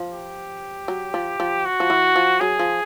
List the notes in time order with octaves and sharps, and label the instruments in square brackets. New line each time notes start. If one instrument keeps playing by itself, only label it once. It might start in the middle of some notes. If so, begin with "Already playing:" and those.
Already playing: [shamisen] F3
[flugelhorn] G4
[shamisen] F#3
F3
F3
[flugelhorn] F#4
[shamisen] F3
E3
F3
[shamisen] F#3 [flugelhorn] G#4
[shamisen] F3